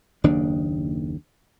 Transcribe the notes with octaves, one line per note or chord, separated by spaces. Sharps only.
F#1 D#2 D#3 D4